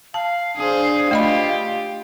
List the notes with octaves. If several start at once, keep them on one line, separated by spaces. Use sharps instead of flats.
F5 A5
D4 G#4 C5
A3 F4 G4 D#5 B5